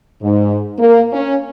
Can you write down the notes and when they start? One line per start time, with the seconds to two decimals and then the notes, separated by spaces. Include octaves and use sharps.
0.23 G#2
0.79 A#3
1.13 C#4